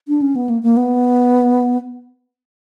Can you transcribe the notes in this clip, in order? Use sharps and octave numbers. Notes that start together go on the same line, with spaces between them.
D4
C#4
B3
A#3
A#3
B3